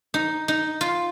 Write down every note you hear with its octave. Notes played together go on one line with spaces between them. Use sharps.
D#4
D#4
F4